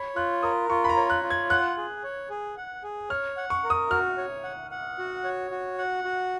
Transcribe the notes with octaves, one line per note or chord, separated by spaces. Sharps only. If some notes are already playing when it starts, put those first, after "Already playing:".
Already playing: C#5 B5
F4 F#6
A#4 D#6
F4 C#6
B5
A#5
C#5
F#6
F4
G#6
F#5 F#6
G#4
C#5
G#4
F#5
G#4
C#5 F6
F#5
C#6
A#4
D#6
F#4 F6
C#5
F#5
F#5
F#4
C#5
F#4
F#5
F#4